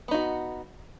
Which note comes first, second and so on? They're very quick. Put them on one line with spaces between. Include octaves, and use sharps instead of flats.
B3 D#4 F#4